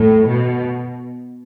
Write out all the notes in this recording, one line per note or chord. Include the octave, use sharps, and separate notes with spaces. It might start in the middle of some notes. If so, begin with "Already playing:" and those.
Already playing: A2
B2